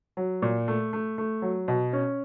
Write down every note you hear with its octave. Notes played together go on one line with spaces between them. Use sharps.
F#3
A#2
A3
A3
A3
F#3
B2
C#4